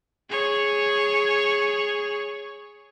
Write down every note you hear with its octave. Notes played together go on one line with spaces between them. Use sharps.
G#4 C#5